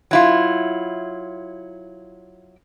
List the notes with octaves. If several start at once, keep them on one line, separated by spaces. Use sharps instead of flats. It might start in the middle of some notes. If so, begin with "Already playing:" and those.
F#3 E4 F4